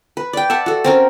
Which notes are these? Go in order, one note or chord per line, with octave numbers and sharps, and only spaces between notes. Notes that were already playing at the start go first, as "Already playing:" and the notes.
B4
D5 G5
E5 F#5 A5
F#4 A4
C4 C#4 A#4